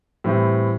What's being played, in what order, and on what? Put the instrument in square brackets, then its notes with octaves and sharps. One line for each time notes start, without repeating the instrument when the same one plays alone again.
[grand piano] A2 E3 G3 C4 E4